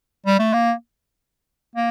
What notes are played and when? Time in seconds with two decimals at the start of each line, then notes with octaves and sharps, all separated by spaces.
0.26 G3
0.39 A3
0.53 A#3
1.76 A#3